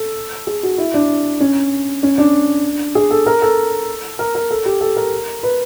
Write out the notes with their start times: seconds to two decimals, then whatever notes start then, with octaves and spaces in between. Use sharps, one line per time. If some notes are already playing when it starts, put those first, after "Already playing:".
Already playing: A4
0.47 G#4
0.63 F#4
0.78 E4
0.94 D4
1.41 C#4
2.03 C#4
2.18 D4
2.95 G#4
3.11 A4
3.26 A#4
3.42 A4
4.19 A#4
4.35 A#4
4.51 A4
4.65 G4
4.81 A4
4.96 A#4
5.43 B4